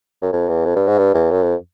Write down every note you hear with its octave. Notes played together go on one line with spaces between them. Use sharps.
F#2
F2
E2
F2
G2
G#2
G2
E2
F#2
F2